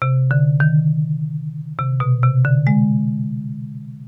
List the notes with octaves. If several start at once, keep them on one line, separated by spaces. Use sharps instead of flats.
C3
D3
D#3
C3
B2
C3
D3
G#3